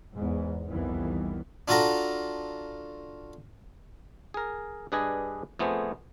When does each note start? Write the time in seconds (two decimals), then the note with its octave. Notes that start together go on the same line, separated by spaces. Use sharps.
0.17 E2 G#2
0.67 C2 F2 D#3 E3 G3 B3
1.68 D4 F4 F#4 A4 A#5
4.34 G#4 A#4
4.92 G2 D4 G#4 B4 D#5 G#5
5.59 F2 A3 B3 G#4 C5 G#5